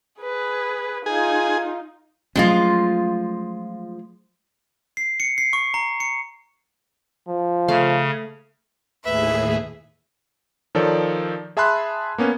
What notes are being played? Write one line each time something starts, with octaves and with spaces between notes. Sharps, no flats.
G#4 B4
D#4 F4 G#4
F3 F#3 G#3 A3 C#4 F4
C7
C#7
C7
C#6
A#5
C#7
F3
C#3 A3 F5
D#2 A2 G#4 B4 E5
D#3 F3 A4 C#5 D5
G#4 E5 A5 B5 C6 F#6
A#3 B3 C#4